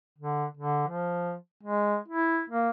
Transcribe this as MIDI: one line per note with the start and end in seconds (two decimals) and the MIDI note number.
0.19 0.45 50
0.57 0.86 50
0.88 1.35 53
1.63 1.97 56
2.08 2.42 64
2.50 2.70 58